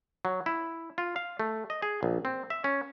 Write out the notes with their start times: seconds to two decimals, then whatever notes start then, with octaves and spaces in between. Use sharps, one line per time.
0.25 F#3
0.46 E4
0.98 F4
1.16 F5
1.40 A3
1.70 D#5
1.82 G#4
2.03 A#1
2.25 C4
2.50 E5
2.64 C#4